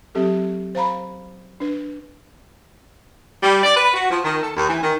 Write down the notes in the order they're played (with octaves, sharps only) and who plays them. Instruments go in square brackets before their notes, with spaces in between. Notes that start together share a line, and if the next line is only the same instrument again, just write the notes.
[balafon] F#3 C4 G4 A4
C5 F5 A#5 B5
D4 B4
[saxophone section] G3
D5
B4
F#4
F3
D#3
A4
D#2
E3
D#3